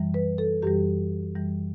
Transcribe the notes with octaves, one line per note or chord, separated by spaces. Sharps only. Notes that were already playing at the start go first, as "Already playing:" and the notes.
Already playing: F#2 E3 G3
B4
A4
F#2 E3 G3 G4
F#2 E3 G3